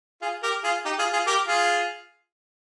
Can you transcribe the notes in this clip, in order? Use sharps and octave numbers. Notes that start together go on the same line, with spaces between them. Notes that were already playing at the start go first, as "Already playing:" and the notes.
F4 G#4
G4 A#4
F4 G#4
D#4 G4
F4 G#4
F4 G#4
G4 A#4
F4 G#4